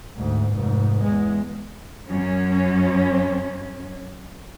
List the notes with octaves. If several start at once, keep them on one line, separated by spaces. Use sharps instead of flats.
D2 G#2
F1 G#2
E2 G#3
F#2 C#4